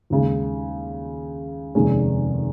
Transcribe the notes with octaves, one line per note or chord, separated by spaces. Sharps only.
D#2 C#3 G#3
F1 D#2 D#3 G#3 C#4